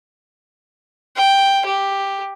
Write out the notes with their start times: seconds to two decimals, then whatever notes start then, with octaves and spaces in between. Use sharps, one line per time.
1.17 G5
1.66 G4